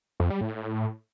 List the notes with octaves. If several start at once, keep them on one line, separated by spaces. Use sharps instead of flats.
F2
G3
A2